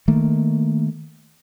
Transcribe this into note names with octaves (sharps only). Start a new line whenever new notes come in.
D#3 A3 A#3